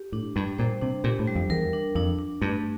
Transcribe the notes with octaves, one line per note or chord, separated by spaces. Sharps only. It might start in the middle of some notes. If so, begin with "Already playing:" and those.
Already playing: G4
A2 D4
G2 G3
A#2 C5
C3 D4
A#2 G4
A2
G3
F2
E2 A#4
D4
F2 D4
D4
G2 A3